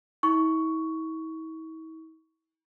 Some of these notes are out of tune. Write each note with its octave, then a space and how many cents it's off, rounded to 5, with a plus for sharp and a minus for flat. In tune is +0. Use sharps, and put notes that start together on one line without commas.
E4 -45 C#6 +10